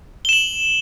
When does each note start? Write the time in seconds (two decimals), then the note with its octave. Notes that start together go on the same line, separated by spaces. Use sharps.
0.25 G7
0.29 E7
0.33 F#7